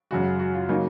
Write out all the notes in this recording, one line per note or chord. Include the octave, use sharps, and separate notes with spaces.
F#2 C#3 G#3 F#4
F#4
F4
C#3 F#3 A#3 D#4